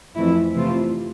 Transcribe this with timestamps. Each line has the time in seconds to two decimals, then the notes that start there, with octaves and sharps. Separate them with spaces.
0.15 F2 E3 A3 E4
0.54 C3 E3 A3 C4 F4